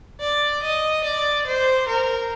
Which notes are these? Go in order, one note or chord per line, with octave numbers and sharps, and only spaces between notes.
D5
D#5
D5
C5
A#4